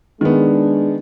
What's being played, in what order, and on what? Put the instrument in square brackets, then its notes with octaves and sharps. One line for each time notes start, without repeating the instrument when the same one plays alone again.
[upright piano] D#3 B3 [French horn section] G#3 D4